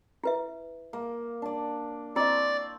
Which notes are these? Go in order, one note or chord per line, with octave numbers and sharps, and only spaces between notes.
E4 B4 E5
A#3
D4 D5
C4 E4 D5 D#5 C#6